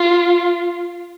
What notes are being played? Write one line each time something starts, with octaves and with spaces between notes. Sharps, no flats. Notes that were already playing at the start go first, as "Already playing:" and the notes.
Already playing: F4